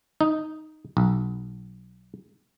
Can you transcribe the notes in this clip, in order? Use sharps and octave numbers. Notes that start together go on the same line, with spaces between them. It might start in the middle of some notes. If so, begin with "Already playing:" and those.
D#4
B1